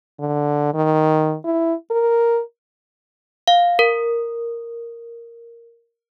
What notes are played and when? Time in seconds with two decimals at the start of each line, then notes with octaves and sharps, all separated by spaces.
0.19 D3
0.74 D#3
1.44 E4
1.91 A#4
3.48 F5
3.79 A#4